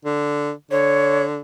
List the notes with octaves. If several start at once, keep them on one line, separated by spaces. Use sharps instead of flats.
D3
D3 C#5